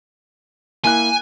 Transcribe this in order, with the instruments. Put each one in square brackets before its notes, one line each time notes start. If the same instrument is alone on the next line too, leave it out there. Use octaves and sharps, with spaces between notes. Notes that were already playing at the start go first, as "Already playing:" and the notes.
[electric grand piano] A#3 E4 F#6 [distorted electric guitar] G#5